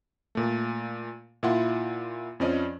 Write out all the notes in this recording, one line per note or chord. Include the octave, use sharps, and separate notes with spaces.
A#2 A3
A#2 E4 F4 F#5 C6
F2 F3 C#4 D5 D#5